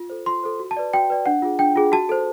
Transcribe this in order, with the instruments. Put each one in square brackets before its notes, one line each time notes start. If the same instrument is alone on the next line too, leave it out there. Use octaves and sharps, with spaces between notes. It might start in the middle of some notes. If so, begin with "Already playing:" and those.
Already playing: [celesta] F4
A4 C5
F4 C6
A4 C5
F#4
A5
B4 D5
F#4 G5
B4 D5
D4 F#5
F4 G#4
D4 G5
F4 G#4
F#4 A5
A4 C5